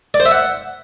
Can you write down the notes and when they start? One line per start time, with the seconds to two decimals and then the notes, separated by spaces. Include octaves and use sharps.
0.14 D5
0.20 C5
0.26 E5
0.31 F#5